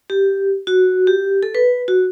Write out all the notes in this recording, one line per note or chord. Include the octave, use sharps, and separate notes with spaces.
G4
F#4
G4
A4
B4
F#4